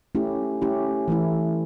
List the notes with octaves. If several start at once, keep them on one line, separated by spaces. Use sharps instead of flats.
A3 C#4 E4 G4
A3 C#4 E4 G4
E3 A3 E4